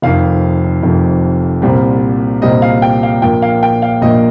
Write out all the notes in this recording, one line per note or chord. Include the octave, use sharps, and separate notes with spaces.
F1 F2 D#3 F5
F1 F2 D#3
C2 A#2 G3 C4
C2 A#2 G3 C4 D#5
F5
G5
F5
A#1 A#2 A#3 G5
F5
G5
F5
A#1 A#2 A#3 D#5